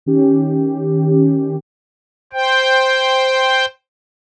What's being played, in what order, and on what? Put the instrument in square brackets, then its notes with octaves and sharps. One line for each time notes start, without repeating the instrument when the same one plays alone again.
[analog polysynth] D#3 C#4 G4
[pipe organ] C5 G5